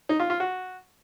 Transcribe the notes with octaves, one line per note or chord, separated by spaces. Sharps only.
D#4
F4
F4
F#4